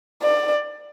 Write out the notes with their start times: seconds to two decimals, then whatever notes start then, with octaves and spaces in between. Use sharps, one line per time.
0.22 D5